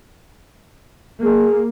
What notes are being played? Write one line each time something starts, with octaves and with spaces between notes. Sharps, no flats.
A#3 G#4